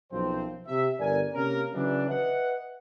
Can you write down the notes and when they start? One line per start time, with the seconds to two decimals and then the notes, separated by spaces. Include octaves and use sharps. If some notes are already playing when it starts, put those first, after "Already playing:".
0.12 B1 F#2 F3 C4 C5
0.68 C3 E5
1.00 G1 A#4 D5 G#5
1.34 C3 A#3 C#4 A#4
1.74 C#3 E3 F#3 D4
2.09 B4 D#5 E5 F#5